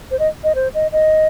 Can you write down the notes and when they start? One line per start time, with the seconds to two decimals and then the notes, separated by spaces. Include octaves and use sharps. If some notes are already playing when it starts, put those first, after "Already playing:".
0.11 C5
0.19 D#5
0.44 D#5
0.55 C5
0.74 D#5
0.92 D#5